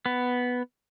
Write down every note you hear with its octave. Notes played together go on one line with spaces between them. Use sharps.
B3